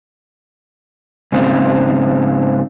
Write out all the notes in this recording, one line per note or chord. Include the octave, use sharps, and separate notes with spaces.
G#2 C#3 A#3 C4